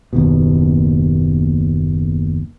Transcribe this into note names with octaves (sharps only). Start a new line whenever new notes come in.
F#1 D#2 B2